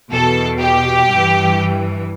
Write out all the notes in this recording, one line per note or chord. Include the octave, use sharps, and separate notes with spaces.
E2 B2 A4
G4
G2 E3